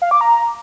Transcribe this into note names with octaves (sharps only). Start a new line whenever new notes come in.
F5
D6
A#5